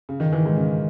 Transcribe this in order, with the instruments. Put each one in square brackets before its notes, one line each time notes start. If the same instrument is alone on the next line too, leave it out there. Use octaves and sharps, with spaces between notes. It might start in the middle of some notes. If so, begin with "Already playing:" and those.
[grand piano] C#3
D#3
E3
G#2
C#3